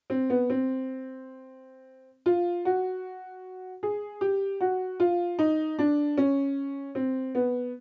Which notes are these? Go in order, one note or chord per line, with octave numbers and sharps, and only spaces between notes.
C4
B3
C4
F4
F#4
G#4
G4
F#4
F4
D#4
D4
C#4
C4
B3